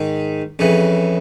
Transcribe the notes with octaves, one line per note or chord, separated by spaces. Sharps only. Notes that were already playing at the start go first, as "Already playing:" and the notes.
Already playing: G#2 D#3
F2 C#3 E3